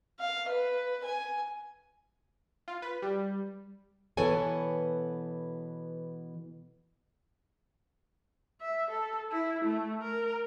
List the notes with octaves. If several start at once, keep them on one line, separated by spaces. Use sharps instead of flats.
F5
B4
G#5
F4
B4
G3
B2 E3 B3 A4 C#5 G#5
E5
A4
E4
A3
A#4